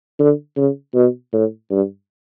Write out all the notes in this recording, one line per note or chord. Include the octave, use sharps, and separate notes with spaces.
D3
C#3
B2
A2
G2